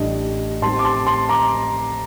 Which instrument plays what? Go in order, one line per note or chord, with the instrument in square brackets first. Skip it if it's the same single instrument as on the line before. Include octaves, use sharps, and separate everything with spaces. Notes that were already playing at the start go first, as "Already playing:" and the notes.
Already playing: [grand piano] A1 A2 G3 D4 D#5
A2 G3 C4 D#4 A5 C6
D6
A5 C6
A5 C6
A#5 D6